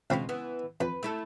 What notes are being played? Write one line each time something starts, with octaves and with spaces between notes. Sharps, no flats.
C#2 B2 C4 F4 B5
E3 B3
F2 B4
A3 E4 A4